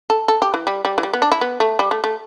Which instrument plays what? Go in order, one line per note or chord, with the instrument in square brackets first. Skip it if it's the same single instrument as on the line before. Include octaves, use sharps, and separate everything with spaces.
[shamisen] A4
A4
G4
E3
G3
G3
E3
G3
B3
D4
E4
B3
A3
G3
A3
A3